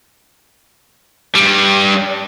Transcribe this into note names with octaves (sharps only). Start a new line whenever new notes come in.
G2 G3